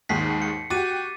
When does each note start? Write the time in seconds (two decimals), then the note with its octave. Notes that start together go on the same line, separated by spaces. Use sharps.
0.09 D#2 G#2 D#3 B6 C7
0.42 C#7
0.70 F#4 G4 D6 A6 D#7